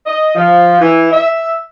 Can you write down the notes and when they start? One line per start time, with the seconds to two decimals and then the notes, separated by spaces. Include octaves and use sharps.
0.06 D#5
0.35 F3
0.79 E3
1.11 E5